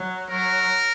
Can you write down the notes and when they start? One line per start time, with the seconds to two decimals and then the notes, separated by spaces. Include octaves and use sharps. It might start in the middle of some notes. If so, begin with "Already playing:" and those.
Already playing: F#3
0.29 F#3 A#4